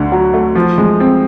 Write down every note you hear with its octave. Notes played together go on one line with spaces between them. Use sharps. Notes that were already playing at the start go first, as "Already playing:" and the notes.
Already playing: D2 D3
F#3
A3
F3
G#3
C4